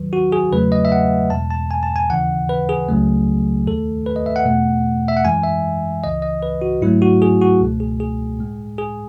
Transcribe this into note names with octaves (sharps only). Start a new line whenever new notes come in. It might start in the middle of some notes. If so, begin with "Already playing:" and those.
Already playing: D#2 D#3 F#3 B4
F#4
G#4
E2 C#3 F#3 A3 B4
D#5
E5
F#5
E2 B2 G#3 A5
A5
G#5
A5
G#5
D#2 C#3 E3 F#5
B4
G#4
C#2 C#3 F#3 A3
D#2 D#3 A3 A4
B4
D#5
E5
F#5
E2 B2 A3
E5
F#5
F#2 E3 G#3 G#5
E5
C#2 C#3 E3 D#5
D#5
B4
F#4
G#2 F#3 A3 E4
F#4
G#4
F#4
C#2 B2 A3
G#4
G#4
A2 G#3
G#4